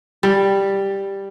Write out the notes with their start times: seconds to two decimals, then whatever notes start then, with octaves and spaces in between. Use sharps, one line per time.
0.23 G3